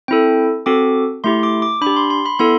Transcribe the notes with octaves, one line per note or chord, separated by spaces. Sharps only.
C4 E4 A4 G5
C4 F#4 A4 D6
A3 E4 G4 C6
D6
D6
D4 B5
G4
C6
C6
B5
B3 E4 A4 C6